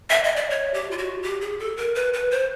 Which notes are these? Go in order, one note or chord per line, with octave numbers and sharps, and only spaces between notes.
E5
D#5
D5
C#5
G4
F4
F#4
G4
G#4
A4
A#4
B4
B4
C5